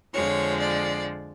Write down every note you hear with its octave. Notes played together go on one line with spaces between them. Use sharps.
F2 D3 F3 G#3 C#5
D5